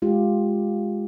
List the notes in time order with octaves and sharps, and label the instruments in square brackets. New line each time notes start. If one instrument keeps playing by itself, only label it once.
[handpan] G#3 F4 G4